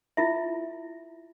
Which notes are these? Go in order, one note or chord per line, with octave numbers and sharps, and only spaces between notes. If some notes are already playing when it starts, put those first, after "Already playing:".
E4 F4 E5